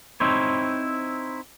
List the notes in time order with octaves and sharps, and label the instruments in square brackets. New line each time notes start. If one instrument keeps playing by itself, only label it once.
[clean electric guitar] C4 D#4 E4 C5 C#5